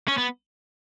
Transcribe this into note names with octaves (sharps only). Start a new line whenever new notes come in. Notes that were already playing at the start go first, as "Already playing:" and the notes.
C#4
B3